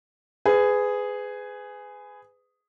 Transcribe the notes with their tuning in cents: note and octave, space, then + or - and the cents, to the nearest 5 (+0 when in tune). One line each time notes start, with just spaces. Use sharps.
G#4 +0 B4 +30